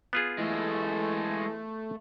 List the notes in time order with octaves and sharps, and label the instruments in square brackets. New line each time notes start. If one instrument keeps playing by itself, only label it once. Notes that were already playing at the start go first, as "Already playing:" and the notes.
[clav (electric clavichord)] B3 F4 G#4
[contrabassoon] E3 [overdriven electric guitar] G#3 A4 [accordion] A3